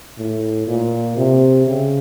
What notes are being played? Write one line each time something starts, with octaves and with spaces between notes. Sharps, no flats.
A2
A#2
C3
C#3